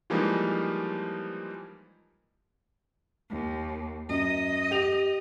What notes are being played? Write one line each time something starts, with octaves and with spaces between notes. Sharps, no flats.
E3 F3 G3 G#3 A#3 D#4
D#2
F#2 D#5
G4 F7